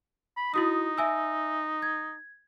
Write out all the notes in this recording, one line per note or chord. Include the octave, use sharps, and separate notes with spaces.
B5
D#4 E4 F#4 D#6
E5 G#5 E6
G#6